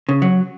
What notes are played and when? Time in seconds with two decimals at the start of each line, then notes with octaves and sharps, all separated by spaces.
0.09 C#3
0.22 F#3